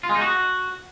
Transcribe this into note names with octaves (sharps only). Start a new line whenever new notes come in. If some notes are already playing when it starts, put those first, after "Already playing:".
F4
G#3
D#4
F#4